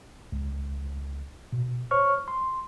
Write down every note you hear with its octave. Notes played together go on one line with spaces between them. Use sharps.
C#2
B2
C5 C#5 C#6 F6
C6